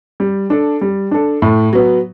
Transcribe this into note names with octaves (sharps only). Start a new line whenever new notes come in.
G3
D4 A4
G3
D4 A4
A2
F#3 B3